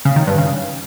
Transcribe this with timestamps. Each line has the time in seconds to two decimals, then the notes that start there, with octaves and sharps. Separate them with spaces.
0.05 C#3
0.16 D#3
0.27 G2
0.38 C#3